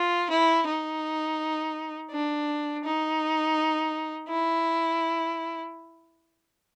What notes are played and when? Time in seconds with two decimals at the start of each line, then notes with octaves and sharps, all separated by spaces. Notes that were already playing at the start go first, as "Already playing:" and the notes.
Already playing: F4
0.30 E4
0.66 D#4
2.11 D4
2.84 D#4
4.29 E4